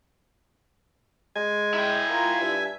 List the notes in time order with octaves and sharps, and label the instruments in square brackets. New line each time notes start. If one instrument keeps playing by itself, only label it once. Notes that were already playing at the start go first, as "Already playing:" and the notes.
[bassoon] G#3 [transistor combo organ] G#5
[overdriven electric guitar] E4 G5
[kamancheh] F4 A#4
[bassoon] G2 [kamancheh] E5